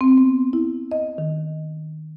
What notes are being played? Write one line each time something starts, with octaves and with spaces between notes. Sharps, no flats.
C4
B3
E4
D#5
D#3